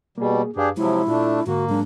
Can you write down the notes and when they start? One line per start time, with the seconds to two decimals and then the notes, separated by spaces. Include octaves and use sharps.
0.18 B2 G3 A#3 G#4
0.56 F#2 D4 G4 G#4 B4 F5
0.77 C3 F3 F#3 G#3 E4
1.07 A#2 A3 D4 F4
1.47 G#2 D3 A#3 F#4
1.69 G#2 F#3 G#3 D4